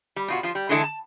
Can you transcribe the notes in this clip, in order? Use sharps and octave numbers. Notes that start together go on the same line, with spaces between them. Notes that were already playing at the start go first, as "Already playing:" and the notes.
G3
B2 F4 F#4
F3 F4
G3
D3 E3 G#3 D4 E4 A4
A5